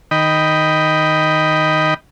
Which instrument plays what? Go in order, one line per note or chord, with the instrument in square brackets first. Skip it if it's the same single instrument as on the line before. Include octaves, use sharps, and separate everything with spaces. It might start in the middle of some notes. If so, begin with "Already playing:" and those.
[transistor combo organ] D#3 D#5 G5 B5